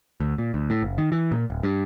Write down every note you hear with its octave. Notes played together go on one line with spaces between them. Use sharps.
D2
A#2
D2
A2
F#1
D#3
E3
A#2
D1
G2